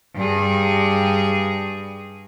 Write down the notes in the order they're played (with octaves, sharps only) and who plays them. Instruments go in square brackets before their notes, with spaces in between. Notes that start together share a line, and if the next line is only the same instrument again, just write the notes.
[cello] G2 G#4